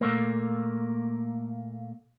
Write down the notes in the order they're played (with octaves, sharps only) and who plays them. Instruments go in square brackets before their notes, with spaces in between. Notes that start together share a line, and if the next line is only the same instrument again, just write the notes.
[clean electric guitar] A#2 A3 A#3